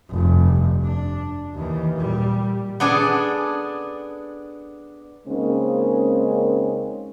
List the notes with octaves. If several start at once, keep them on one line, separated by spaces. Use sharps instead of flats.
F1 G2
D4
D#2 E3
A#2 G3
B3 D4 G#4 A4
C#3 G#3 A#3 C4 C#4 D#4